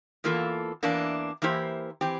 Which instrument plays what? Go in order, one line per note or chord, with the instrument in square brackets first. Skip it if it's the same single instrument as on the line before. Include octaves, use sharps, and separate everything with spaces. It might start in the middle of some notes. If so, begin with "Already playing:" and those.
[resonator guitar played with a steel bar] E2 E3 A#3 F4 A4
E2 E3 A#3 D4
E3 A#3 E4 G4 C5
E3 C4 G4